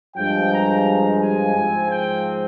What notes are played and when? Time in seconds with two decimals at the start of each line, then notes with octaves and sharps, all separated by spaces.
0.16 G2 F3 G#3 G5
0.50 A#5
1.20 G#5
1.55 G#2 F3 G#3 C4
1.89 G5